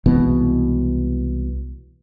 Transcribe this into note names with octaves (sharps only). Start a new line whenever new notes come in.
C2 B2 E3 G#3